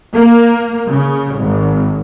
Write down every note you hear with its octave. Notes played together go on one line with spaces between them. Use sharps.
A#3
C#3
G#1